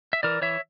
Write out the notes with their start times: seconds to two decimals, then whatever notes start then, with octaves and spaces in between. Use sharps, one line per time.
0.13 E5
0.23 E3 A#4 D5
0.42 E3 C#5 E5